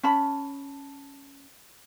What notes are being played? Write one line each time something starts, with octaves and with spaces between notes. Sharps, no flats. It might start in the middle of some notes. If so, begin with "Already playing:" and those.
C#4 A5 B5